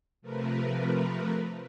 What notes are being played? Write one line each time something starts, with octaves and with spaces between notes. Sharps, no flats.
C3 F3 A3 A#4 B4